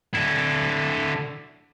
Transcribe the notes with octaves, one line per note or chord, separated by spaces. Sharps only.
D3 E4